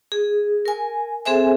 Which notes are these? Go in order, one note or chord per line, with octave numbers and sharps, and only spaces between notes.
G#4
A#4 G#5
C4 G#4 A4 C5 E5 G#5